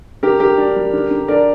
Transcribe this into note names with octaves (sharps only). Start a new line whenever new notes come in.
D3 G4 A#4
D3 G4 A#4
D4
G3
D3
D3
D4 A#4 D5